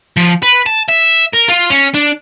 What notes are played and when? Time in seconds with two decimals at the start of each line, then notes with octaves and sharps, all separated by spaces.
0.17 F3
0.43 B4
0.66 A5
0.88 E5
1.33 A#4
1.48 F4
1.70 C#4
1.94 D4